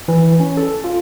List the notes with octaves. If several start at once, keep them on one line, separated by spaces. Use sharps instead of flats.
E3
C#4
A4
F4